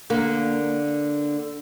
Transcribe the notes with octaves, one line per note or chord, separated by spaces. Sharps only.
D3 A#3